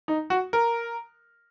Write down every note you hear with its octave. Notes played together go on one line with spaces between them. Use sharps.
D#4
F#4
A#4